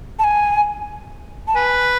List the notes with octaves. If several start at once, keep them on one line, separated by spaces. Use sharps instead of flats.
A5
G#5
A5
B4 G#5